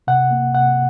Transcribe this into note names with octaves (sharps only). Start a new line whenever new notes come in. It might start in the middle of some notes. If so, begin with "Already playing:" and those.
C3 F#5
A#3
C3 F#5